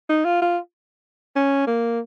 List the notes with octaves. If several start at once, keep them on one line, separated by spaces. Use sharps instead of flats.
D#4
F4
F4
C#4
A#3